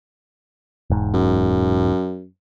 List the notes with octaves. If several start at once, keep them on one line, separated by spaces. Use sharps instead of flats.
E1 G#2
F#2